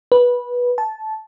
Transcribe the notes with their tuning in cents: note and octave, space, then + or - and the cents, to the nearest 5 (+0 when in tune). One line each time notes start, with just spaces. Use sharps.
B4 -15
A5 -15